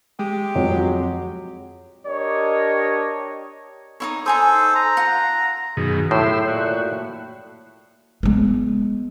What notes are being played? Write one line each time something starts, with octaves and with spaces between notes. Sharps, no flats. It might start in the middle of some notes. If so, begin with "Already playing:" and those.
G#3 G4
F2 F#3
D4 G4 A#4 C#5 D#5
D#4 E4 C#5
D#4 A4 C5 G#5 D#6
A#5
F4 F#5
F#2 B2 D#3 G#4
A2 G4 C#5 E5 C6
A#2 F#4
G#3 B3